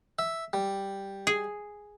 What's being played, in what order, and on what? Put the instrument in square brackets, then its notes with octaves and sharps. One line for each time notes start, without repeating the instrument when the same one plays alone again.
[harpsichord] E5
G3
[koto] G#4